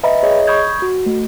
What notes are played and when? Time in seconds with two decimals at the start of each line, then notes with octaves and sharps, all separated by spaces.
0.03 B4 D#5 E5 G5 A#5 B5
0.23 G#4 C#5 D#5
0.47 B5 C#6 D#6 G6 G#6
0.82 F#4
1.06 A3